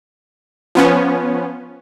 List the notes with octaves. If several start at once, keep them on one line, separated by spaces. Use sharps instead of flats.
F3 B3 C#4